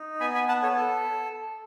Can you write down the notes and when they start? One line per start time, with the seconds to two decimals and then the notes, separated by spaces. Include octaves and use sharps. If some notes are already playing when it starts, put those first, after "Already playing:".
Already playing: D#4
0.20 B3 G#5 B5
0.34 G#5 B5
0.48 B3 F#5 A5
0.63 A4 C#5
0.76 A4